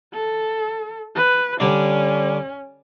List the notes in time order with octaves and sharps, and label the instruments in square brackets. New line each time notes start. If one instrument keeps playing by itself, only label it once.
[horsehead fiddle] A4
B4
[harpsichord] D3 G3 D4 [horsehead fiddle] C#4